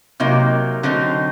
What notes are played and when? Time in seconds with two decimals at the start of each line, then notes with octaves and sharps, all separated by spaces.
0.20 C3 F#3 A#3 D#4
0.83 D3 F#3 C4 D#4